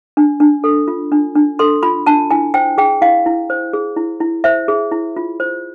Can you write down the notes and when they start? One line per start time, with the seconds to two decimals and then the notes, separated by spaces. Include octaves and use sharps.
0.17 D4
0.40 D4
0.64 A4
0.88 F4
1.12 D4
1.35 D4
1.59 A4 C6
1.83 F4 B5
2.06 D4 A5
2.31 E4 G#5
2.54 C5 G5
2.78 G#4 G5
3.01 E4 F5
3.26 E4
3.50 C5
3.73 G#4
3.96 E4
4.20 E4
4.44 C5 E5
4.68 G#4
4.92 E4
5.16 F4
5.40 C5